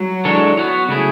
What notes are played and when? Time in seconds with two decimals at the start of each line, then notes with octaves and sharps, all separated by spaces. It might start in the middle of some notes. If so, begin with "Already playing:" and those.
Already playing: F#3
0.25 E3 G#3 D4 A4 C#5
0.57 B3 F#4 C#5
0.89 C#3 F#3 A3 E4 G#4